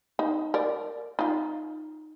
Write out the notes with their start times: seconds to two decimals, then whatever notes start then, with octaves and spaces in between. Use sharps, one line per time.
0.19 D#4
0.54 A#4 D5
1.19 D#4 F4